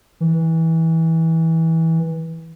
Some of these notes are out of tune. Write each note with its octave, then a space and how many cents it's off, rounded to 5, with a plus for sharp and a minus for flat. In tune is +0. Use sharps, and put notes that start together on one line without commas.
E3 -20